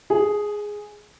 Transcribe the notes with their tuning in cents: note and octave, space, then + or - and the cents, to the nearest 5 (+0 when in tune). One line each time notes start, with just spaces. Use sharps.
G#4 +0 G#5 +40